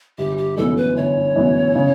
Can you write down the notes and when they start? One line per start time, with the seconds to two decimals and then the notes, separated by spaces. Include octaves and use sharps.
0.18 G1 G4
0.38 G4
0.57 F#2 E3 B3 A4
0.77 B4
0.96 G1 C#5
1.36 F#2 E3 B3
1.75 C#3